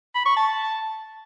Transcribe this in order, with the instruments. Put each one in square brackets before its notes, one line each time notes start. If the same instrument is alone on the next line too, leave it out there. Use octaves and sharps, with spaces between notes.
[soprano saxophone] B5
C#6
A5